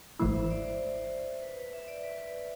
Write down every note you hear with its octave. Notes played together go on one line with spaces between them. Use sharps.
G#1 G#2 E3 A3 E4 C5
E5
D5
C5
B4
B4
E5
D5
B4
B4